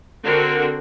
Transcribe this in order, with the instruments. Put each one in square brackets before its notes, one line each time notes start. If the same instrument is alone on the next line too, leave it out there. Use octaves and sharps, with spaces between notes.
[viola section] D3 C4 F#4 A#4